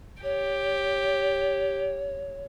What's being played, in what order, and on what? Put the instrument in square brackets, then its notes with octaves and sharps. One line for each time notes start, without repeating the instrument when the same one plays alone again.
[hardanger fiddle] G4 [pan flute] C#5